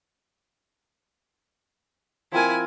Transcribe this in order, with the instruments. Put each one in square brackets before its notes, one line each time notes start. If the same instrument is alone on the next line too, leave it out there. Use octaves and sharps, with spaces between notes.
[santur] F3 C4 A#4 [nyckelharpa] E4 G#5